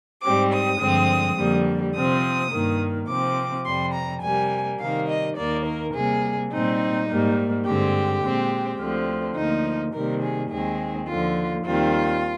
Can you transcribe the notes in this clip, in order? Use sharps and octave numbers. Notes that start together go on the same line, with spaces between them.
G#2 G3 C4 D6
D#6
G2 D3 F3 G#3 C4
F2 D3 G3 A#3
C3 F3 C4 D#6
G2 D#3 A#3
C3 F3 C4 D6
F2 C3 G3 C6
A#5
C3 G3 A#3 G#5
C3 D#3 G3 A#3 F5
D#5
D#2 D#3 A#3 D5
A#4
C3 G3 A#3 G#4
A#2 G3 C4 D#4
G#2 G3 A#3
G2 D3 G#3 C4 G4
A#2 G#3 C4
D2 D3 F3 C4
D2 D3 F3 A#3 D#4
C3 D#3 G3 A#3 A#4
G#4
D#2 D#3 G#3 C4 G#4
D#2 D3 F3 F4
D#2 D#3 G3 C4 F4